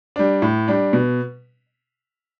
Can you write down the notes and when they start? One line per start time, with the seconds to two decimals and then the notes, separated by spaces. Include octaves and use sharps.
0.16 G3 D4
0.42 A2
0.68 G3 D4
0.93 B2